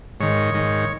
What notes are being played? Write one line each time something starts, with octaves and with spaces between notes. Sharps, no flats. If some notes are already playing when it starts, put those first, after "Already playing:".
G#2 D#3 C#5
G#2 D#3